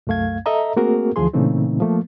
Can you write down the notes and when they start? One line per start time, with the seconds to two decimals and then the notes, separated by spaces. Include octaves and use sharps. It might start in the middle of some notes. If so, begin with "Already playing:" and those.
0.07 C2 F#2 A3 F5 G#6
0.46 A4 D#5 E5 A#5
0.76 A3 A#3 C4 F#4 G#4 A#4
1.16 D2 E3 F3 G#4 C6
1.33 A#2 C#3 E3 A3 C4 D#4
1.80 F3 A3 A#3